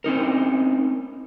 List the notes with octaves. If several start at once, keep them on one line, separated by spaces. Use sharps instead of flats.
C4 C#4 D#4 A#4